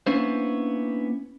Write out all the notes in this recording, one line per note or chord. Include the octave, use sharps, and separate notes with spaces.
A#3 B3 C#4 D4 E4 C5